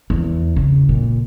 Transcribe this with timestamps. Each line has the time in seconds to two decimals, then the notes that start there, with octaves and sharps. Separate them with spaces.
0.10 E2
0.56 C#3
0.89 A#2